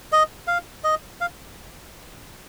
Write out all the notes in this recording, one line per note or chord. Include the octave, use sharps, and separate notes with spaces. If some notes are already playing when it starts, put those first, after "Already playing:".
D#5
F5
D#5
F5